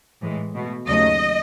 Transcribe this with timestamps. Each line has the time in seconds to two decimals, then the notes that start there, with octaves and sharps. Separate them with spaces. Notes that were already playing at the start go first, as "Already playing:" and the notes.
0.21 A2 E3 G#3
0.55 B2 A3
0.88 D#2 C#3 F#3 A3 D#5